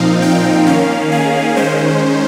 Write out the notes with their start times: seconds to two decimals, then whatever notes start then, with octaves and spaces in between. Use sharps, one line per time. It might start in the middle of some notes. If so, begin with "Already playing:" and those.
Already playing: A#2 F3 C4 D#4 F5
0.22 G5
0.67 D#3 A#3 C#4 F5
1.12 G#4
1.56 D#3 G#3 C#4 C5